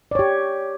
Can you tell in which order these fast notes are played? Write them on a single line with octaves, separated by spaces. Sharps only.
D5 C#5 G4